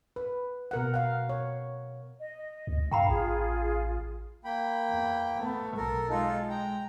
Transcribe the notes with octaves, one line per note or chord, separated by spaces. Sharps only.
B4
B2 A#4 F#5
F5 F#5
C#5
D#5
D2
G2 F5 G5 A#5 B5
A1 F4 G#4
A#3 G5 B5
E2
A3 B3
B1 A4 A#4
G#3 D#4 F4 A4
G5 A#5